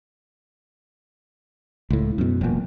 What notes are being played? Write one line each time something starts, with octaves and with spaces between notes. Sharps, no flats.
C#2 A2
F#2 B2
E1 A#2